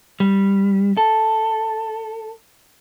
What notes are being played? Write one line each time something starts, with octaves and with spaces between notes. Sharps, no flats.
G3
A4